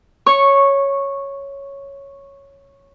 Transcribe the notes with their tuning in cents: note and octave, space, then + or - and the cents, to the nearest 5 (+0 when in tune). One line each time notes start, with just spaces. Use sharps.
C#5 +0 C#6 -10